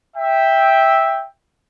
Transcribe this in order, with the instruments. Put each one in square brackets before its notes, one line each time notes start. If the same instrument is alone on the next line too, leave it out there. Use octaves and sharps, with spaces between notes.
[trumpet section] E5 G5